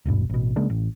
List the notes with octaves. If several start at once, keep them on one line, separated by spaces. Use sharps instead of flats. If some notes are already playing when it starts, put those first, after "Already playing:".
D#1 G#1 G2 B2
A1 B2
C#3 G#3 A#3 D4
A1